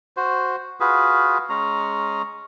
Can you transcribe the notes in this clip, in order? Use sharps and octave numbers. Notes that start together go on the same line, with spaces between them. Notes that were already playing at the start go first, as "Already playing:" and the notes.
F#4 C5
F4 F#4 G#4 B4
G#3 C#4 A#5